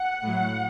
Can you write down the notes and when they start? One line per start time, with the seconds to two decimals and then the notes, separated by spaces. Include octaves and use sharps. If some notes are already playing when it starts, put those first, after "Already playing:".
Already playing: F#5
0.22 A2 F#3